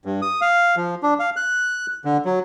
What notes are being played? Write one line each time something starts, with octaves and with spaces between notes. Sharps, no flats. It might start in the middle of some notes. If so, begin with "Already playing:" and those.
G2
D#6
F5
F3
D4
F5
F#6
D3
F#3